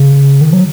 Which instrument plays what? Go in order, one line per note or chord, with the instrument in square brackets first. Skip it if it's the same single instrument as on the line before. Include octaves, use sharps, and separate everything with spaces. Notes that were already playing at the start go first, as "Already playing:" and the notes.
Already playing: [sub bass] C#3
D#3
F#3